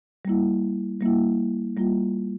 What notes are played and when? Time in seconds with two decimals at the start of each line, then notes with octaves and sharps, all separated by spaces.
0.25 G3 A#3 E4
1.01 G3 A#3 E4
1.77 G3 A#3 F4